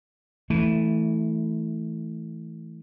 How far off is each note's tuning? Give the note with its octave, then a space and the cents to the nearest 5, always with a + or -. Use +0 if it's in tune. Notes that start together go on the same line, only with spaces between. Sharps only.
E3 -15 A3 +0